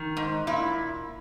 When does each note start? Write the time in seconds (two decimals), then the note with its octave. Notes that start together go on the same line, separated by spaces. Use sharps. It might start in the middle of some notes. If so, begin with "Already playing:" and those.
Already playing: D#3
0.17 G#2
0.47 A#2 E4